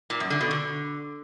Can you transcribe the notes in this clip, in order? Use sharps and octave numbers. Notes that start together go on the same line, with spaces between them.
A#2
F#2
D3
B2
D3